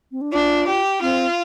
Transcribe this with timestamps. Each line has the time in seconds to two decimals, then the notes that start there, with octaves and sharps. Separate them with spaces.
0.12 C4
0.21 D4
0.32 D4 F4
0.67 G4
1.01 C4 F4